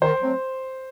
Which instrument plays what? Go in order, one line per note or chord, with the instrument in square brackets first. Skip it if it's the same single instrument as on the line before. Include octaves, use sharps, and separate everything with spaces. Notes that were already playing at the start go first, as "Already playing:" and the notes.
[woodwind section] D#3 [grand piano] C5
[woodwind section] F#3 A3 C4